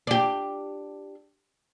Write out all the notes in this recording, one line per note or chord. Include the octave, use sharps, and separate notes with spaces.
D4 G4